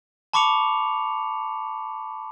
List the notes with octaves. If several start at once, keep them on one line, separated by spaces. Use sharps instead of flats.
A5 B5 C#6 D6 C#7 F7